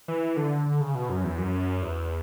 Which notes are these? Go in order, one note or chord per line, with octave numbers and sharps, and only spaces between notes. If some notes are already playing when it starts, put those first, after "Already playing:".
E3
D3
D3
C#3
B2
F#2
E2
F#2
E2